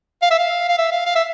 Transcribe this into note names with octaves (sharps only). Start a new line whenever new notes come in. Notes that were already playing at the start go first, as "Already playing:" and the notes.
F5
E5
F5
F5
E5
F5
F5
E5